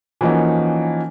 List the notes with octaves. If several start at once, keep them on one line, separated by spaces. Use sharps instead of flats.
E3 F3 A#3 C#4 D#4 F#4